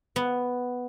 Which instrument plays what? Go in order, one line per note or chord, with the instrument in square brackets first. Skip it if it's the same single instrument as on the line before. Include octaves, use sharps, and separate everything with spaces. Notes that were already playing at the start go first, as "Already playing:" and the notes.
[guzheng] B3